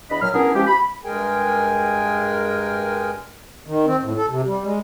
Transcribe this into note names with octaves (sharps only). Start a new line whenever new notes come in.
E2 D4 D#5 B5
A#2 F#3 F6
B3 C#4 D4 E4 G#4 A#4
F3 G#3 C#4 G4
B5
G2 G#3 G#4 A#4 G5 G#5
D#3
C4
A2
A4
C3
G3
G#3